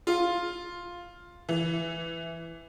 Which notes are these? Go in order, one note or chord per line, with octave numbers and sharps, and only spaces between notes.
F4
E3